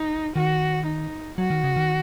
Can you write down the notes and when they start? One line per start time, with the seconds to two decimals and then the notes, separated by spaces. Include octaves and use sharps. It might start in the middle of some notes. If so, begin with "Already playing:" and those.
Already playing: D#4
0.36 D#3 F#4
0.86 D#4
1.38 F#3 F#4
1.50 D#3
1.64 C#3
1.76 D#3